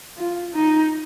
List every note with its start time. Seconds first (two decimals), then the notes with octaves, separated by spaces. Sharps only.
0.17 F4
0.54 D#4